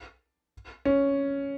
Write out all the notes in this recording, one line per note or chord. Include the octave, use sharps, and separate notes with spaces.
C#4